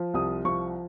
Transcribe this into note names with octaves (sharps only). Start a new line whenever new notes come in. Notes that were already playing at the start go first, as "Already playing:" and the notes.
Already playing: F3
C2 D#6
F3 C#6